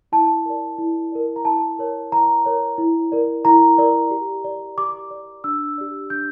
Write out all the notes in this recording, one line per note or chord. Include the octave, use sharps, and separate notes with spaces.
E4 A5
A#4 D5
E4
A#4 D5
A#5
E4 A5
A#4 C#5
E4 A#5
A#4 C#5
E4
A#4 D5
E4 A#5
A#4 D5
G4
D5
G4 D6
D5
D4 E6
G4 D5
D4 G6